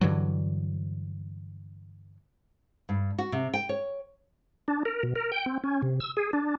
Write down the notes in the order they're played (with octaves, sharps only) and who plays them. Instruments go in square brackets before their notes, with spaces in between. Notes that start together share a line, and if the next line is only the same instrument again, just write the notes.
[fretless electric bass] G2 D3 E3 F#3
[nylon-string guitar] G2
F#4
C3
G5
C#5
[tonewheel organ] D4
A#4
B2
A#4
G5
C4
C#4
C3
E6
G#4
D4